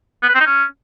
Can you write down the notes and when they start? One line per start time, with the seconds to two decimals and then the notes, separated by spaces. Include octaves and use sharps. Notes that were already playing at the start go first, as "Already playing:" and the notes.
0.23 B3
0.29 B4
0.34 C4
0.40 D#4
0.46 C#4